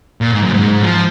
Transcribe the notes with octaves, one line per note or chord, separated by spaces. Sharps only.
A#2
G#2
F#2
G#2
F3